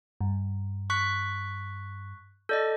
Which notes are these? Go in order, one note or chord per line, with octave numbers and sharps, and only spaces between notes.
G2
C#6 F#6 B6
A4 D5 D#5 G6